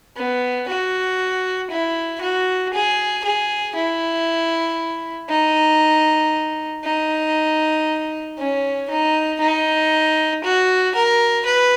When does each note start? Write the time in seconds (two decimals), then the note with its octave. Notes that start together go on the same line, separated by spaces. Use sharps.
0.17 B3
0.68 F#4
1.70 E4
2.21 F#4
2.74 G#4
3.24 G#4
3.75 E4
5.29 D#4
6.85 D#4
8.38 C#4
8.90 D#4
9.41 D#4
10.44 F#4
10.95 A#4
11.46 B4